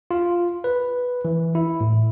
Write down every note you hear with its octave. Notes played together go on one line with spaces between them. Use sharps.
F4
B4
E3
E4
A2